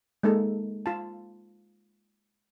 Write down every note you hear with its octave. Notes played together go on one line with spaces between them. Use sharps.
G#3 A#3 D#4 A4
F4 A5